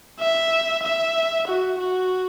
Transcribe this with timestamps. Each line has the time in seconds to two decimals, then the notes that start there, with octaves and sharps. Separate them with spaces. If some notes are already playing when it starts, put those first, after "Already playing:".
0.20 E5
0.83 E5
1.48 F#4
1.79 F#4